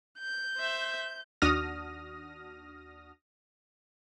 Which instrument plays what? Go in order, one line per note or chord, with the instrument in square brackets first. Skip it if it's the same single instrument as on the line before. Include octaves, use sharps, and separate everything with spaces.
[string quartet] G6
[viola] C5 E5
[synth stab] D#2 D4 F#4 D#6 F6 A#6